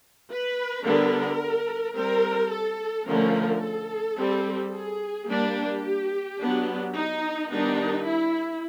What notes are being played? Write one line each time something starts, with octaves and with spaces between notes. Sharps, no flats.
B4
D3 G3 B3 D4 A#4
G3 C4 A#4
A4
D3 F3 A3 C#4 A#4
A4
G3 C4
G#4
G3 A#3 D4 G4
F#3 B3 D4
D#4
D#3 G3 B3 D4 D#4
E4